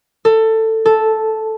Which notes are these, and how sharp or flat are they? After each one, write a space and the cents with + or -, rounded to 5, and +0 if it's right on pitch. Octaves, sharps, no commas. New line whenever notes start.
A4 +15
A4 -5